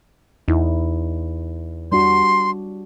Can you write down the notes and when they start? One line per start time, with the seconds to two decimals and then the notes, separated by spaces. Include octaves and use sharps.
0.48 E2 D#4 E4
1.92 G3 D4 F#4 C6